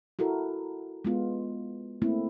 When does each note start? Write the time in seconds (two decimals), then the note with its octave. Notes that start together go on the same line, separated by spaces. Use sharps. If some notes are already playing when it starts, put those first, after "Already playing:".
0.19 E4 F#4 A4 A#4
1.05 G#3 B3 F4
2.02 A3 A#3 C4 E4